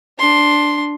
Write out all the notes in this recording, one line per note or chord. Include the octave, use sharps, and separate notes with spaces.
D4 C6